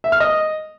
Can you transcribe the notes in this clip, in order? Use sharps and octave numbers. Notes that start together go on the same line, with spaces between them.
E5
F6
D#5